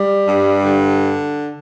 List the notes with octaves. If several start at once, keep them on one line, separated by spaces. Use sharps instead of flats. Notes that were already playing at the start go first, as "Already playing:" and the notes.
Already playing: G3
G2
D3